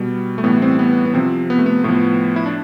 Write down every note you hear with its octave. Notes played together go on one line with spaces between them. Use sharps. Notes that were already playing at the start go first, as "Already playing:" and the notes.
Already playing: B2 G3
A3
A2 E3 G3 B3
C4
B3
B3
C3 F3 C4
B3
A3
B3
A2 F3 B3
E4
D4